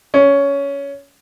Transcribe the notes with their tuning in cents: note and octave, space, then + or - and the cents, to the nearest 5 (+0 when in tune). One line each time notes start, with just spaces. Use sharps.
C#4 +15